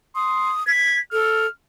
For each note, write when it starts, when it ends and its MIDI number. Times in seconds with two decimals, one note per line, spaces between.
0.16 0.53 84
0.16 0.65 87
0.67 0.97 92
0.67 1.00 95
1.12 1.46 69
1.12 1.48 89